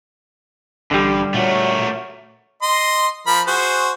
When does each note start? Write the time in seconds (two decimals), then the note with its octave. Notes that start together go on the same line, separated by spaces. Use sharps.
0.91 A1 G2 D3 G3
1.34 A#2 A3 F#4 A#4 C#5
2.63 D#5 C6
3.27 F3 A#4 B5
3.47 F#4 G#4 C5